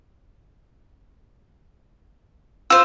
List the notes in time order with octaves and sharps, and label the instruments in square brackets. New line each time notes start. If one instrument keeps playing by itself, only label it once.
[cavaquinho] F4 C5 [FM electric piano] E6